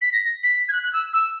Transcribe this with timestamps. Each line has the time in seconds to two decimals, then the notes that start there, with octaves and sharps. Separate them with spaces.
0.01 B6
0.12 A#6
0.43 B6
0.68 G#6
0.72 F#6
0.83 F#6
0.93 E6
1.13 E6